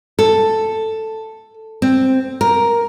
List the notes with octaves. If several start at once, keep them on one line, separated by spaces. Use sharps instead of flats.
A4
C4
A#4